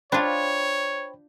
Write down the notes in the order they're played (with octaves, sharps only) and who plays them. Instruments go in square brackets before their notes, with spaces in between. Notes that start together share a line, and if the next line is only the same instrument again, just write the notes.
[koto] D4 F4 [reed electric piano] C5 G5 B5 [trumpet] C#5